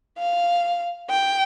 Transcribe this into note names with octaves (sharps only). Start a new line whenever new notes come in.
F5
G5